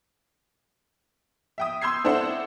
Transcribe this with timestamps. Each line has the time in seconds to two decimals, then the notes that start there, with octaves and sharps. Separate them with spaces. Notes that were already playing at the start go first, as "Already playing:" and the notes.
1.58 E5 G5 D#6
1.82 C6 E6 G6 G#6 C7
2.04 C4 D4 E4 A4 C5 F#5